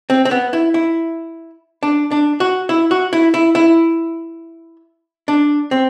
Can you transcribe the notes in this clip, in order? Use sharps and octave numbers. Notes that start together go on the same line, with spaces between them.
C4
C4
B3
E4
E4
D4
D4
F#4
E4
F#4
E4
E4
E4
D4
C4